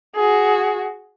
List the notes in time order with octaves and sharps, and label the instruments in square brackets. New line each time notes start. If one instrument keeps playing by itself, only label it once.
[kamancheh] F#4 G#4